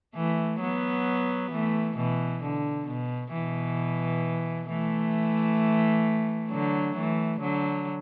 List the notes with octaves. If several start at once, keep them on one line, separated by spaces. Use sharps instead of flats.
E3 A3
F#3 B3
E3 A3
B2 E3
D3
B2
B2 E3
E3 A3
D3 F#3
E3 A3
D3 F#3